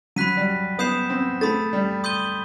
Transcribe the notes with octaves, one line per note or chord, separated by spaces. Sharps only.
F#3 B5 F#6 B6 D#7
G3
B3 B5 D#6 G6 C7 E7
C4
A3 B5 D#6 A6
G3
C6 D#6 G6 D#7 G7